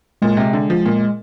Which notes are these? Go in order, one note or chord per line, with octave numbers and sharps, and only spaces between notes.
A#2 G#3
C3
D3
F3
A#2